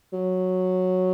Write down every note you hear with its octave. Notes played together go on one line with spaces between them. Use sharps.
F#3